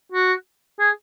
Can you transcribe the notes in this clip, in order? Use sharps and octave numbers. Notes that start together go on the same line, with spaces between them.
F#4
G#4